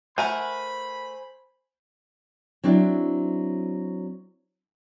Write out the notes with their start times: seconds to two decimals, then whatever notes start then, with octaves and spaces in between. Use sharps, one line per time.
0.18 A3 A#4 C5 F#5 G#5 B5
2.63 F#3 C4 D4 E4